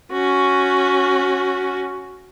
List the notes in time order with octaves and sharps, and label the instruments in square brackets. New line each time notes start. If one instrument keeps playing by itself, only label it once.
[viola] C#4 F#4